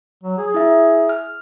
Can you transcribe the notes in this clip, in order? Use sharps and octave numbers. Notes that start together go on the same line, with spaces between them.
F#3
G#4
E4 E5
F6